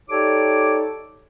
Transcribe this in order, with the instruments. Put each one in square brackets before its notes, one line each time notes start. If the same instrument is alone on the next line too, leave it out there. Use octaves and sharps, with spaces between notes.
[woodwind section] D#4 G4 A4 C#5 D5 D6